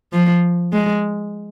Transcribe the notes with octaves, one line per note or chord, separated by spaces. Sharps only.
F3
G#3